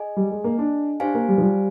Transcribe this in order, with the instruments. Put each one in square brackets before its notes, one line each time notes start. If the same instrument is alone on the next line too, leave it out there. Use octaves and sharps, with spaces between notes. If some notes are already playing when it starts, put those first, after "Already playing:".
Already playing: [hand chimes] G#4 D#5 G#5
[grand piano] G3
G#3
A#3
D4
[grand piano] D4 [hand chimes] G4 C5 F5 G#5
[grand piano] A#3
G3
F3
G3